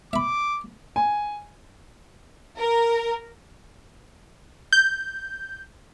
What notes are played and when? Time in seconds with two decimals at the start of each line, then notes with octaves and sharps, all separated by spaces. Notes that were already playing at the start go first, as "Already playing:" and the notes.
0.13 E5 B5 D6
0.96 G#5
2.57 A#4
4.73 G6